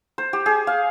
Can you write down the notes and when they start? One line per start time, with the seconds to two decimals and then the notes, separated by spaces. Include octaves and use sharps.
0.18 C5
0.33 G4
0.46 G#4
0.67 F5